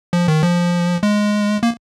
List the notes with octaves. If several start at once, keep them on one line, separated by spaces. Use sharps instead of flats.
F3
D#3
F3
G#3
A#3